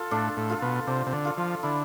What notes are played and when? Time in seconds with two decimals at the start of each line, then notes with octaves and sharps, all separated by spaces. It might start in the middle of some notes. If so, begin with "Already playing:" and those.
Already playing: F4 A4
0.11 A2 D4
0.37 A2
0.50 F4 A4
0.62 B2
0.87 C3 D4
1.07 C3
1.13 D3
1.25 F4 A4
1.37 F3
1.63 D3 E4